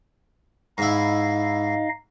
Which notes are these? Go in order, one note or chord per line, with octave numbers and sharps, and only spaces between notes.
G#2 D#4 E4 D#5 F5